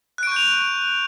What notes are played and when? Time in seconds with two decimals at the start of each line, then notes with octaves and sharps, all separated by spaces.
0.18 F#6
0.23 D7
0.27 C#6
0.32 G6
0.36 F7